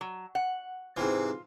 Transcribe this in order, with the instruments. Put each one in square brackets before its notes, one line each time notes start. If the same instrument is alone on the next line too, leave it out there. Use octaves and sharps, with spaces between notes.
[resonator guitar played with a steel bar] F#3
F#5
[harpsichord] G#2 C3 E3 [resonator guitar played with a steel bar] F4